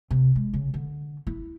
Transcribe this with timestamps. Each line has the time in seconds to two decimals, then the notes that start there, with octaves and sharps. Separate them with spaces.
0.11 C3
0.35 G#3
0.54 C#3
0.74 D3
1.27 E4